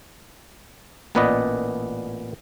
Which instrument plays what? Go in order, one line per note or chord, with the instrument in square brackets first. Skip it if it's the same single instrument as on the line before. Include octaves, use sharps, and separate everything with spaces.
[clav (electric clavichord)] A1 A#2 B3 B4 D5 D#5